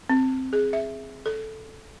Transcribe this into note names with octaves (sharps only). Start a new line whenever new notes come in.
C4
G#4
E5
A4